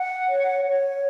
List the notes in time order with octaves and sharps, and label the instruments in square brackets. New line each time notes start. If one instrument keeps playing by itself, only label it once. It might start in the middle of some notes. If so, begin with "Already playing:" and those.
Already playing: [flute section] F#5
C#5
C#5